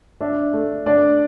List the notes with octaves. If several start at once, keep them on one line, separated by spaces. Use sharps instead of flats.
D4 E5
A3
D4 D5